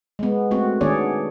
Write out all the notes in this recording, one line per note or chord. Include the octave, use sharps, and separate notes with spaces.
G#3 B3
A3 C4 F#4
D#3 B3 D4 G#4 C#5 D5